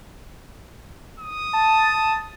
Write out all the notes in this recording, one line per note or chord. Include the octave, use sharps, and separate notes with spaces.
D#6
A5